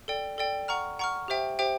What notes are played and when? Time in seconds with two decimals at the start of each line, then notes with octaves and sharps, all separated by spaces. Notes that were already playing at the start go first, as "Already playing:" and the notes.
0.08 A4 D5 G5
0.38 A4 D5 G5
0.68 F#5 A#5 C#6 F6
0.99 F#5 A#5 C#6 F6
1.28 G4 C5 E5 G5
1.59 G4 C5 E5 G5